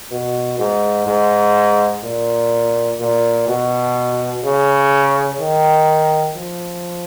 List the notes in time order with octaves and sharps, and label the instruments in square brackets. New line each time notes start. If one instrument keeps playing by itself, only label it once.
[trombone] B2
G#2
G#2
A#2
A#2
B2
C#3
D#3
F3